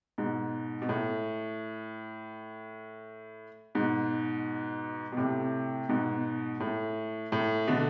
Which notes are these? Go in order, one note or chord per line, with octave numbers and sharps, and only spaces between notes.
G#2 B2
B2
A2
G#2 B2
B2
A2 C3
G#2 B2
A2
A2
B2 D3